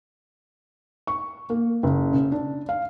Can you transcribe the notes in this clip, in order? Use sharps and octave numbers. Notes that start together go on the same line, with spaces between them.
C#6
A#3
F#1
C#3
D4
F5